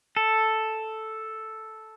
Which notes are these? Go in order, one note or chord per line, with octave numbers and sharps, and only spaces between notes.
A4